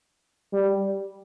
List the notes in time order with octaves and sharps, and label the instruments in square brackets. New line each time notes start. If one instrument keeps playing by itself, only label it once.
[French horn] G3